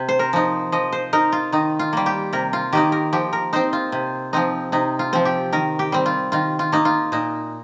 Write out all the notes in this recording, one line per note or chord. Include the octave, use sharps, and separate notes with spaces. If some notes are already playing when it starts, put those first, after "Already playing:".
Already playing: C3
C5
A#4
F3 D#4
F3 D#5
C5
D#4 A#4
F4
D#3 D#4
F4
G3 A#3
G4
C3 A#4
F4
D#3 A#3 D#4 G4
A#4
F3 G4
A#4
C4 D#4 C5
F4
C3
F3 C4 D#4
C3 D#4
F4
F3 C4
G4
D#3 A#4
G4
G3 C4
F4
D#3 F4
F4
A#3 D#4
F4
A#2 D#4